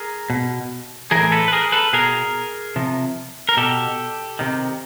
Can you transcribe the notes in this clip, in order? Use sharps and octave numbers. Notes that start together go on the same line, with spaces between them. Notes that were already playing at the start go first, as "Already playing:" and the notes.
Already playing: G#4 A#4
B2
A2 E3 G#4 A#4
A4 B4
B4
G#4 A#4
A4 B4
B2 G#4 A#4
C3 F3
A#4
B2 G4 A4
C3 D#3